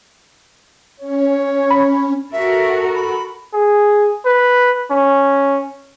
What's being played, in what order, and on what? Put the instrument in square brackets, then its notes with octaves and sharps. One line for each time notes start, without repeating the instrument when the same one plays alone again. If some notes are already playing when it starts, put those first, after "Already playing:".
[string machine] C#4 [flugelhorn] C#5
[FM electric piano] B5
[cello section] F#4 A4 A#4 [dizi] E5
[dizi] B5
[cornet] G#4
B4
C#4